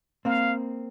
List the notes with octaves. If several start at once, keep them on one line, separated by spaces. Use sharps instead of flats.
A#3 C4 F5